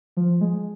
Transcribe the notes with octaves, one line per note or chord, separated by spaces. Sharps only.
F3
G#3